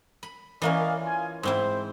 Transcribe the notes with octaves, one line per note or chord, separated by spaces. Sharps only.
B5
E3 A#3 C#4 D5 D#5 F5
F4 G#5
G#2 C4 E4 C5